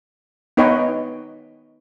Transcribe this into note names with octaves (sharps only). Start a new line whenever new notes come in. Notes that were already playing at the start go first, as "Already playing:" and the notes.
B3 D#4 B4 C#5 D#5 G5